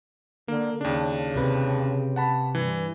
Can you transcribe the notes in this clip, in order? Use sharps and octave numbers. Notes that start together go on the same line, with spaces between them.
D3 A#3
D#2 C#3 D4
C3 B4
F#5 A5 B5
G2 E3